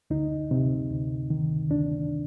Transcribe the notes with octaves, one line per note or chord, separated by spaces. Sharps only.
D2 D#4
C3
D2
D#3
D2 D4